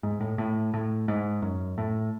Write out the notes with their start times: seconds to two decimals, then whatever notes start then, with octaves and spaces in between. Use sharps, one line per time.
0.03 G#2
0.20 A2
0.38 A2
0.74 A2
1.08 G#2
1.42 F#2
1.78 A2